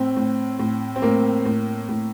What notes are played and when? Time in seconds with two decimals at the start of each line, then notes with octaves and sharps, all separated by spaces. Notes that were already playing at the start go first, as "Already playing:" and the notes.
Already playing: A2 C4
0.16 A2
0.59 A2
0.96 C4
1.02 A2 A#3
1.45 A2
1.89 A2